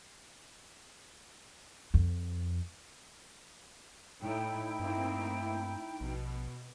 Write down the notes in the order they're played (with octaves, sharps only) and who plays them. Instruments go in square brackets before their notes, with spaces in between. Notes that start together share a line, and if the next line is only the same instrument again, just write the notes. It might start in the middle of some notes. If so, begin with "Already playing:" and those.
[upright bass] F2
[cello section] A2 [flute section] D#4 E4 G5
[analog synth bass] G2 [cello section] A3 A#3 C4
[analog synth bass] A#1 [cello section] B2